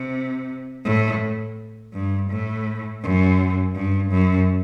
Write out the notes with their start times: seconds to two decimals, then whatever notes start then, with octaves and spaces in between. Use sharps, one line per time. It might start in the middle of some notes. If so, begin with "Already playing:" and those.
Already playing: C3
0.85 A2
1.93 G2
2.30 A2
3.02 F#2
3.75 G2
4.10 F#2